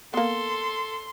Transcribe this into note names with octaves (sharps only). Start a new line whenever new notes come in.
A#3 B3 A4 C6